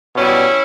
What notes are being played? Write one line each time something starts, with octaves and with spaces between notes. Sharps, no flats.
B2 G3 C#4 E4